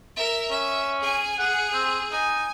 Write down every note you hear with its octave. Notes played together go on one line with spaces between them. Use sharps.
A#4 E5
C#4 E5
G#4 G#5
G#4 F#5
C4
D#4 G#5